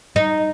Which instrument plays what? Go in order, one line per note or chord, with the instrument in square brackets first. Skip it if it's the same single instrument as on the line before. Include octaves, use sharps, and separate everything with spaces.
[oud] D#4